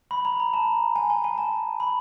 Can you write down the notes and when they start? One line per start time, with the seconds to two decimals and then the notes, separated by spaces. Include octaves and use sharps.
0.11 B5
0.25 A#5
0.40 A#5
0.53 A5
0.96 G#5
1.10 G#5
1.24 G#5
1.38 A5
1.80 B5